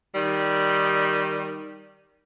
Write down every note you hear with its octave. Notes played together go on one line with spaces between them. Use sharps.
D#3 G3